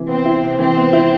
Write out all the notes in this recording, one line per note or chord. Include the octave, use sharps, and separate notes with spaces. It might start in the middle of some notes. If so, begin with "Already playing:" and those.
Already playing: C3 E3
B3 C4
E4
C3
E3 C4
B3
E4